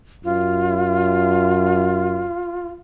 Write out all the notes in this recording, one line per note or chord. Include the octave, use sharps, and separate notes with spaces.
F#2 F4